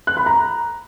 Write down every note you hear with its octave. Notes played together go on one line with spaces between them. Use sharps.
F#6
B5
A#5